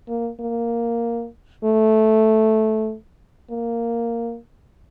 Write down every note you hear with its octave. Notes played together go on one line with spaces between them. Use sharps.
A#3
A#3
A3
A#3